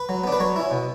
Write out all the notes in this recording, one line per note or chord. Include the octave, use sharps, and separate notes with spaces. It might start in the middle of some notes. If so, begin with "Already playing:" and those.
Already playing: B4
F#3
B3 D4
B4
F#3 C#5
C#4 E4
B2